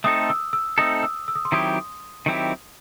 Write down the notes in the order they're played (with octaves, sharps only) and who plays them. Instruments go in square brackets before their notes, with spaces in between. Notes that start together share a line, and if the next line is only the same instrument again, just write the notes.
[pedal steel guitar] A3 C4 D#4 A4 [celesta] D#6
[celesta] E6
E6
[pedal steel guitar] A3 C4 D#4 A4 [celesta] D#6
[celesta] E6
E6
D#6
C6
[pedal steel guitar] D#3 F#3 C4 E4 G4 [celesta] D#6
[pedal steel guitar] D#3 F#3 C4 E4 G4